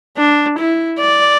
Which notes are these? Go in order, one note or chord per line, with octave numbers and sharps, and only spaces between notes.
D4
E4
D5